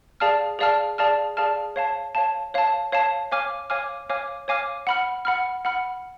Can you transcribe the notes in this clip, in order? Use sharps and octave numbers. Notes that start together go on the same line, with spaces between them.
G#4 D5 F5 A5 F6
G#4 D5 F5 A5 F6
G#4 D5 F5 A5 F6
G#4 D5 F5 A5 F6
C#5 F5 A5
C#5 F5 A5
C#5 F5 A5
C#5 F5 A5
C#5 F5 G#5 D6 F6
C#5 F5 G#5 D6 F6
C#5 F5 G#5 D6 F6
C#5 F5 G#5 D6 F6
F#5 B5 F6
F#5 B5 F6
F#5 B5 F6